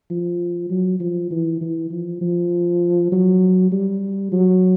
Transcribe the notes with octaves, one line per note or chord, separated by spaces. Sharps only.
F3
F#3
F3
E3
E3
F3
F3
F#3
G3
F#3